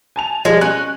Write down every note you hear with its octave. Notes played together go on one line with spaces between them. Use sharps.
G#5 A5 F7
F3 G3 G#3
C#4 F#6